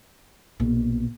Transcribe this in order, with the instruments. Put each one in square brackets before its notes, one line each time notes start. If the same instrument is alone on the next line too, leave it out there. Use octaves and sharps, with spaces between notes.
[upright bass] A#1 B2